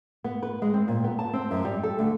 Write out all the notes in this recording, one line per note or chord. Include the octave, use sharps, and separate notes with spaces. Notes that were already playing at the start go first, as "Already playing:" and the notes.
B3
B4
G#3
C4
A#2
B3
A5
C4
F#2
G3
A4
D2